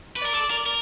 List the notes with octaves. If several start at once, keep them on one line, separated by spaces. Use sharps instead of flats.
B4 D5
A#4
A4
A#4
A#4